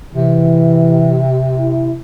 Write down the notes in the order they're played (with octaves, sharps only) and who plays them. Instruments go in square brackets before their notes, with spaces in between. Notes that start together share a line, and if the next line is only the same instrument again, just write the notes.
[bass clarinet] C3 [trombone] E3
[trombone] E4